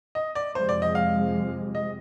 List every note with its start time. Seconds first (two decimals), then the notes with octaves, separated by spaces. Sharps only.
0.15 D#5
0.35 D5
0.55 F2 C3 F3 G#3 C5
0.69 D5
0.82 D#5
0.95 F5
1.75 D#5